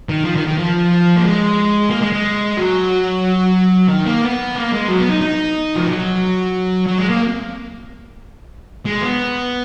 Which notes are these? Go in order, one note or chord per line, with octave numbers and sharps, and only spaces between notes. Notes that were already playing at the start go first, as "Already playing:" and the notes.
D#3
F3
D#3
D#3
F3
A#3
G#3
A#3
G#3
G#3
F#3
D#3
A#3
B3
A#3
G#3
F#3
B3
D#4
D#4
F3
F#3
F#3
G#3
A#3
G#3
B3